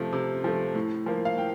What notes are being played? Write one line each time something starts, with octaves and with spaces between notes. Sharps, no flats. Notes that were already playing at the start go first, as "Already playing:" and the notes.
Already playing: C3 F3 A3
C3
F3 A3
A2
F3 A#3
F5
A2 G5